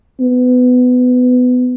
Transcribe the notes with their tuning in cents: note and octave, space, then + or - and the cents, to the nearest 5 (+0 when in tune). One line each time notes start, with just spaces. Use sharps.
B3 +20